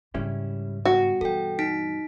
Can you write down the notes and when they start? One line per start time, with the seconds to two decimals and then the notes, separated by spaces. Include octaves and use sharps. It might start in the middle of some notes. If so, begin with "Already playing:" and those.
0.14 G#2 C#3 G3 C#4 E4
0.85 G2 B2 F#4
1.21 E3 A4 G5
1.59 D#4 B6 D7